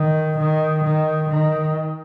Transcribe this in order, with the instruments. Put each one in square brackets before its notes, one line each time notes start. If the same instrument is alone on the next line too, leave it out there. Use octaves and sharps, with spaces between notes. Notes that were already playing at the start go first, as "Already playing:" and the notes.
Already playing: [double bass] D#3
D#3
D#3
D#3